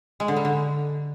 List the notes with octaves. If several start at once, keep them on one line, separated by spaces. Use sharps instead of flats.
G#3
D3
G3
D3